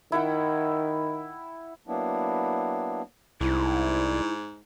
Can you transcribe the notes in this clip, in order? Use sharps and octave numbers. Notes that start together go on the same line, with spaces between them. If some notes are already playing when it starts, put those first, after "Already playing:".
D#3 E4 F#5 G5
F#3 A#3 B3 D4 E4
C2 G#2 E4